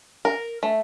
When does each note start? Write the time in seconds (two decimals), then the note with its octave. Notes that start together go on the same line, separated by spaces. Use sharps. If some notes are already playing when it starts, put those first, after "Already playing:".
0.25 A#4
0.63 A3